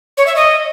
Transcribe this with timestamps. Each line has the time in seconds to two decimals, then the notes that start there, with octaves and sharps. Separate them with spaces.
0.17 C#5
0.27 E5
0.36 D#5